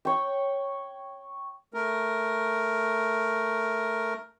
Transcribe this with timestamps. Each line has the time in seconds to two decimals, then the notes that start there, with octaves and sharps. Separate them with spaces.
0.05 C#5 G5
1.74 A3 A#4